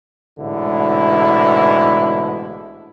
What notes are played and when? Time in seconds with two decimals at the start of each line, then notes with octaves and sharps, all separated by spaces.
0.39 A1 G#2 B2 D3 E4